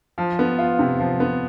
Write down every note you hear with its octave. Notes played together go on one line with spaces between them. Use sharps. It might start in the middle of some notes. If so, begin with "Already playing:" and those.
F3
B3
F4
C3
F3
B3